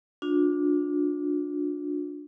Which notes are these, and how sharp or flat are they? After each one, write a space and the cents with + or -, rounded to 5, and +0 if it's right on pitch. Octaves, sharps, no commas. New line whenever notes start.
D4 +0 F4 +45